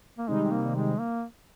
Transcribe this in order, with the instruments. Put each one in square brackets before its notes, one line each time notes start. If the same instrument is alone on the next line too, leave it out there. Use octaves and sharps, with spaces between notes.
[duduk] A#3
[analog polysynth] C3 D#3 G3 C4 D#4 [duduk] G#3
[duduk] A#3
G#3
A#3